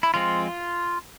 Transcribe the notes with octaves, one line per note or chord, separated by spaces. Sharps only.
E4
F3 G#3 C4 F4